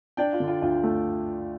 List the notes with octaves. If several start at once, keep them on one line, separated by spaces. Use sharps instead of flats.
D4 D5 G5
F4
D3
F4
D2 F4
A3